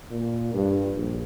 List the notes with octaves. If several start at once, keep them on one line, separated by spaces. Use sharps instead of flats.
A#2
G2
A#1